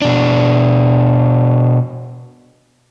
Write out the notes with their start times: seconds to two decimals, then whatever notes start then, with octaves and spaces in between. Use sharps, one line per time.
0.02 B2 D4